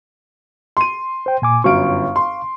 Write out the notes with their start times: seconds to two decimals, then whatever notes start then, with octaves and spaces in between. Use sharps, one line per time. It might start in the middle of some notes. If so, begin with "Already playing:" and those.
0.77 C6 D#7
1.26 C5 G5
1.42 A#2 G#5 D6
1.64 G1 F#2 F5 C#6 D7
2.16 C6